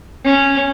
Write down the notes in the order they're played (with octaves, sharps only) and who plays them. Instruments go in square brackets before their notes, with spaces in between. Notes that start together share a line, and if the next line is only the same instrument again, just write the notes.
[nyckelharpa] C#4